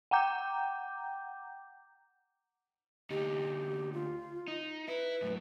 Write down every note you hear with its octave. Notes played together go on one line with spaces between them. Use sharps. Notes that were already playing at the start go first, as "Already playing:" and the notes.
F#5 G5 A#5 D6 G6
D2 D#4 G4
F4
D#4
E4 B4
F#2 A2